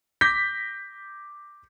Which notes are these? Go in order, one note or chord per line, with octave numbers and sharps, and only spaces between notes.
D6 G6 A#6 B6